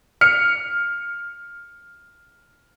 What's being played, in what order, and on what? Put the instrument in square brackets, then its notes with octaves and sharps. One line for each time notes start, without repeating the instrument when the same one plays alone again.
[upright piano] F6 C#7